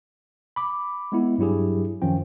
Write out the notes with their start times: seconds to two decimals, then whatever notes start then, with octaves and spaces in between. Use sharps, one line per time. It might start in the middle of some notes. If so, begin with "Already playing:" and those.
0.56 B5 D6
1.12 G#3 B3 E4
1.38 G2 F#3 E4 G4 G#4
2.02 F#2 D#3 F3 C#4 G5